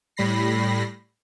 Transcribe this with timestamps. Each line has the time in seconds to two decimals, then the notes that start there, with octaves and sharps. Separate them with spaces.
0.17 A2 G3 B5 A#6 C7